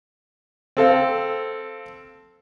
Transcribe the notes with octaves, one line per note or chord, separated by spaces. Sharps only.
C4 A4 F5